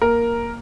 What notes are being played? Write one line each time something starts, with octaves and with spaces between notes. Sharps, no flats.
A#3 A#4